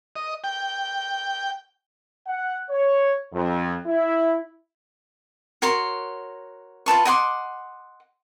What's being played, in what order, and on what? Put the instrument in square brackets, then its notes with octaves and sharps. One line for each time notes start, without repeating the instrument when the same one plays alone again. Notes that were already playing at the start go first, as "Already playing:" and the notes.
[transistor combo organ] D#5
G5
[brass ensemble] F#5
C#5
F2
E4
[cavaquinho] F#4 A#4 C#5 C6
F4 B4 A5 C#6
D#5 F#5 C6 D6